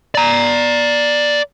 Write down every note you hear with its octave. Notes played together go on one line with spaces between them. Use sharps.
D5 A#5